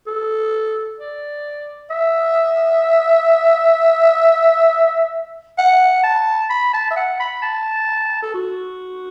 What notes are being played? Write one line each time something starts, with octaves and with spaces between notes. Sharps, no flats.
A4
D5
E5
F#5
A5
B5
A5
E5
F#5
B5
A5
A4
F#4